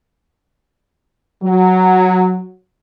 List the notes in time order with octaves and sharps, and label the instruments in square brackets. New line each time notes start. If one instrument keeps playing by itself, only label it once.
[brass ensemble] F#3